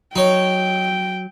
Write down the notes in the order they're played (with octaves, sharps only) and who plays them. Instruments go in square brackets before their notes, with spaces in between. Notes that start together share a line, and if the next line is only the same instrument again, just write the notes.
[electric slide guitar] F#3 [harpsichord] D#4 C#5 [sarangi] G5